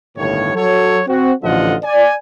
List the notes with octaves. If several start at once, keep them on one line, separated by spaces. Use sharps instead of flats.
G1 D#2 A2 D#3 C#5
F#3 A4 C#5
C4 F#4
A1 D3 F3 F4 D#5 F#5
D5 G#5